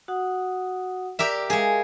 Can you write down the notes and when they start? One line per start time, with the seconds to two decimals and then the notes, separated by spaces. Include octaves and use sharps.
0.08 F#4 F#5 D#6
1.19 G4 A#4 D5 E5
1.50 G#3 G#4 A#4 F5